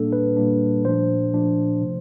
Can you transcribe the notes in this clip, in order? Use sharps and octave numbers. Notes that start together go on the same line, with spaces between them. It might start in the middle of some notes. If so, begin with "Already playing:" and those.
Already playing: A#2 G3 A#3 D4 A4
B4
A#2 G3 A#3 D4
A#2 F3 A3 D4 C5
A#2 F3 A3 D4
C3 F3